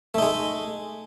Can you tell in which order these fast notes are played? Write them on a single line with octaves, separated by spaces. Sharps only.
A3 D#4 G#3